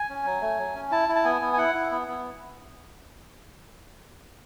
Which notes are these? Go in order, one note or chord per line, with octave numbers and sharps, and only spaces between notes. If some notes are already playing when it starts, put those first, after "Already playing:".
Already playing: G#5
C#4
F#3
A3
F#3
C#4
E4 A5
E4
A5
B3 G#5
B3
G#5
E4 F#5
E4
B3
B3